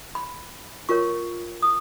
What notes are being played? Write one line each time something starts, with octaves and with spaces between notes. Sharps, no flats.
B5
F4 A#4 C#5 C#6
D#6